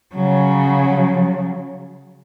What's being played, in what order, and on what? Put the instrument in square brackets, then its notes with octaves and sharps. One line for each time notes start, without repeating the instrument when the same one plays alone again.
[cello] C#3 F#3